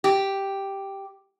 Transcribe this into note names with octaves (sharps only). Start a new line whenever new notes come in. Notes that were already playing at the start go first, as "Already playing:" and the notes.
G4